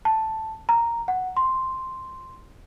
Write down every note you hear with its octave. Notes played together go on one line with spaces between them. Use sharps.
A5
A#5
F#5
C6